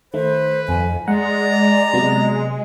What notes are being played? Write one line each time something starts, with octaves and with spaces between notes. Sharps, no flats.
D#3 A3 B4 C5
F2 G#5
G#3 D5 F#5 A#5
C3 F#3 B3